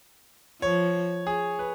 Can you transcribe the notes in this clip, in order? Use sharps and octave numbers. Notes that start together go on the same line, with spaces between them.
F3 C#5
G#4
B4